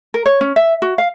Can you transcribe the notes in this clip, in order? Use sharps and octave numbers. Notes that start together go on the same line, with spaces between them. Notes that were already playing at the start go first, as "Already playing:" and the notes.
A#4
C#5
C#4
E5
F#4
F5